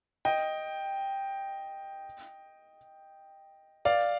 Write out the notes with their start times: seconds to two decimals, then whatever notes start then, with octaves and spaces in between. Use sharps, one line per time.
0.25 D#5 G5
3.85 D5 F5